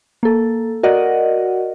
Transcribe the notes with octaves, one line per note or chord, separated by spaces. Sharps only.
A#3 A4
F#4 A#4 D5 D#5 F#5